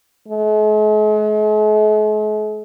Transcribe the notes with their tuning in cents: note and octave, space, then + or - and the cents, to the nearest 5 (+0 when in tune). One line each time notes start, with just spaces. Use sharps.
G#3 +45